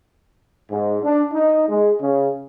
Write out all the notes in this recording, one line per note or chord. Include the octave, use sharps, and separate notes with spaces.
G#2
D4
D#4
G#3
C#3